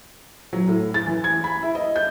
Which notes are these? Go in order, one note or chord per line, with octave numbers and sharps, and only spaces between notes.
F#3
A2
A6
E3
G#6
B5
E4
D#5
G6